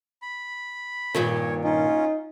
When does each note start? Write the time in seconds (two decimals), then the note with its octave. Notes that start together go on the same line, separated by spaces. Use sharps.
0.22 B5
1.15 G2 A#2 D#3 C#5
1.64 C#4 D#4 F4